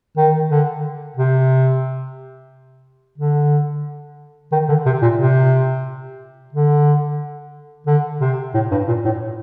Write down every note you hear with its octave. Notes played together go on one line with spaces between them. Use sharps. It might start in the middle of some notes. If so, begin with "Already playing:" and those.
D#3
D3
C3
D3
D#3
D3
C3
A#2
C3
D3
D3
C3
A2
G2
A#2
A2